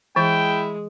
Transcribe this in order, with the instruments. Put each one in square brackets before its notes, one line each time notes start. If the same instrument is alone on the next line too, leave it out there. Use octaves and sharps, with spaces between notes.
[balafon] E3 [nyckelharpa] G#3 [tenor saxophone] E4 [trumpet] G5